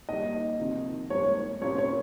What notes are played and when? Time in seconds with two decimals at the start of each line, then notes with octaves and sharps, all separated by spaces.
0.08 D#2 D#3 G3 D#5
0.59 F2 C3 D#3
1.10 G#2 D#3 G3 A#3 C#5
1.61 C2 A#2 G3 A#3 C#4 C#5
1.78 C#5